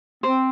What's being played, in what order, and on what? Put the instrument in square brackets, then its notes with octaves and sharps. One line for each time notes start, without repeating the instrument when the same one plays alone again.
[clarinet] C4 [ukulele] C5